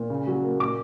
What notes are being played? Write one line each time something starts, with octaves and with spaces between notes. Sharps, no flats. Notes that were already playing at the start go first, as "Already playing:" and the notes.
Already playing: A#2
C#3
F#3
A#3
A#2 D6